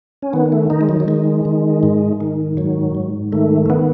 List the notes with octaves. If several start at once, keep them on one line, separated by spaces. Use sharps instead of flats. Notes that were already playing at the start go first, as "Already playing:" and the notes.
C#4
D#3 B3
A3
D#3 D#4
G#3
F#3
F#3
D#3 G#3
D#3
G#2
D#3
G#2 F#3
G#2
D#3 A3
A3
D#3 B3